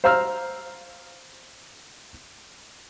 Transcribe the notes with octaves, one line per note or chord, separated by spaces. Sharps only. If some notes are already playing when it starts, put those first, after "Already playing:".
C5 F5 A#5 E6 F6